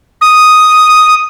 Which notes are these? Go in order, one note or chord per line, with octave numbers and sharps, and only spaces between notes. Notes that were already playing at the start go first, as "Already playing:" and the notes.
D#6